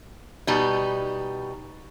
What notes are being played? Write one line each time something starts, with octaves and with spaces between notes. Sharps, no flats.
B2 G3 D#4